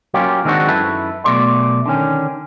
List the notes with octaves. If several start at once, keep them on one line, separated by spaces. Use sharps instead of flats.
F#3 A#3 C#4 F4 G4
D#3 G#3 C4 D4 F#4
F#2 E4 A4 B4
B2 F#3 A3 D5 C6
D3 D#3 C#4